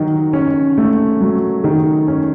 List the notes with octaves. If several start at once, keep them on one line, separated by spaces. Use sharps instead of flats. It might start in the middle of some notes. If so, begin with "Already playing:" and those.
Already playing: D#3 F#3
C#4
A3
F#3
D#3
C#4